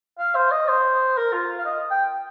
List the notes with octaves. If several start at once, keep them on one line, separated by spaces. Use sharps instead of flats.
F5
C5
D#5
C5
A#4
F4
F5
D#5
G5